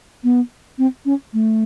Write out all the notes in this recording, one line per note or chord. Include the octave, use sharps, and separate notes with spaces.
B3
C4
C#4
A3